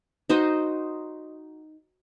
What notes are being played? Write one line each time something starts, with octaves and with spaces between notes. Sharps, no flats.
D#4 F#4 C5 D#5